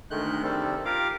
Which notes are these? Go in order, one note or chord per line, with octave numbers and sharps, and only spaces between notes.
D2 D#3 G#3 A3 F#6 G6
C3 D#3 G3 C4 A4
F4 G4 A#4 F5 D6